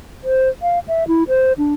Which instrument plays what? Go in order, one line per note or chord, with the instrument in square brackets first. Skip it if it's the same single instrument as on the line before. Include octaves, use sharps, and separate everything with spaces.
[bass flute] C5
F5
E5
E4
C5
D4